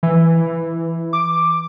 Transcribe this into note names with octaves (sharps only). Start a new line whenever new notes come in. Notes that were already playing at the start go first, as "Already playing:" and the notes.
E3
D6